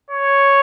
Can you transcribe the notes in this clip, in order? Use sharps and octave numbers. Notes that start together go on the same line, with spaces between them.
C#5